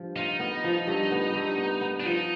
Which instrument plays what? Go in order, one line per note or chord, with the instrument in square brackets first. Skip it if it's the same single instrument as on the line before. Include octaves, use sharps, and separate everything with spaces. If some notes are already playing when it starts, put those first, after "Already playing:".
Already playing: [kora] G2 F3
[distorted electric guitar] D#4 [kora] F4
[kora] B3
F3
G2
B3
G2
B3
B3
[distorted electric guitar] D4
[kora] F3 [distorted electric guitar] D#4